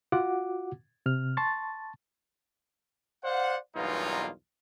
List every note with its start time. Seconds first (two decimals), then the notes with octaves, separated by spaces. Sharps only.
0.12 F4 F#4 F#5 D6
1.06 C3 F6
1.37 A5 C6 C#6 A6
3.23 C5 D5 F5 F#5
3.75 B1 E2 G2 A#3 D#4 F4